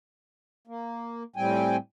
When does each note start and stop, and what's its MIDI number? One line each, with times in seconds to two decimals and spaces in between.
0.67 1.23 58
1.36 1.77 45
1.36 1.77 55
1.36 1.77 60
1.36 1.77 79
1.36 1.77 80